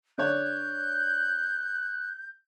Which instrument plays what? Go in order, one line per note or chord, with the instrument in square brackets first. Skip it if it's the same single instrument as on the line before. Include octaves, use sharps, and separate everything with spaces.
[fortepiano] D3 D4 C#5 [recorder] F#6 [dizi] G6